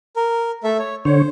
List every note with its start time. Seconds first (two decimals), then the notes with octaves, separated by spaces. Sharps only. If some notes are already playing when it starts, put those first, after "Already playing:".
0.16 A#4
0.64 A3 A4 E5
0.79 C#5
1.05 D3 C5 C#5